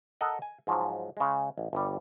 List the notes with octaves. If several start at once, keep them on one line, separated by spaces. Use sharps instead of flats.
A4 A#4 D#5 F#5
G#5
G#2 F3 F#3
C#3 G#3
A1
G1 G3